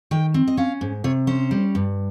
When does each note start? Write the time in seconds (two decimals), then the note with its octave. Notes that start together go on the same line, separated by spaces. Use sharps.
0.11 D#3 G5
0.34 C4
0.48 D#5
0.57 C#4 F5
0.81 G#2
1.04 C3 C#5
1.27 C#4 C5
1.51 G3
1.75 G2